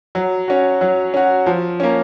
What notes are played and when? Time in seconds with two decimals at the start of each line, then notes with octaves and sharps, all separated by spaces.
0.15 F#3
0.48 C#4 F#4
0.81 F#3
1.14 C#4 F#4
1.46 F3
1.80 A#3 C#4